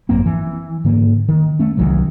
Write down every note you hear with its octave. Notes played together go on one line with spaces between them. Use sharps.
G#1 F#2 A#3 C4
E3
G#2 D3 A#3
D#3
A3 C#4
C2 D#3 E3 F#3